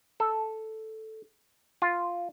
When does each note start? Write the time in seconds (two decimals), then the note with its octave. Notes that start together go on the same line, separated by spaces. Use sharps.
0.20 A4
1.82 F4